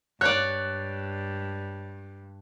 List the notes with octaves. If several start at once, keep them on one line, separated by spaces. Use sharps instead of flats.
G2 C#5 D5 F#6